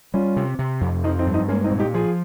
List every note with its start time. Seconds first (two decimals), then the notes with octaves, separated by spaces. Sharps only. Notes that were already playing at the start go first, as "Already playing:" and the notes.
0.14 G3 C#4 F4
0.37 C3
0.59 C3
0.81 F2
1.04 F3 C4 D#4
1.19 C4 D#4
1.27 G2
1.33 C4 D#4
1.48 G#3 A#3 C#4
1.64 C4 D#4
1.71 A#2
1.79 D#4 G4
1.94 F3 F4 G#4